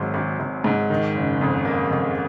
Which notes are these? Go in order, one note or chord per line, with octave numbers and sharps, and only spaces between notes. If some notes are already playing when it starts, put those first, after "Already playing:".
Already playing: G#1 G#2 F#3
G#1
G#1
G#2
D#3
F#1
F2
A#3
F2